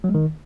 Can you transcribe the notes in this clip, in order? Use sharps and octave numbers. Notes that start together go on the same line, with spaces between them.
F#3
G#3
D#3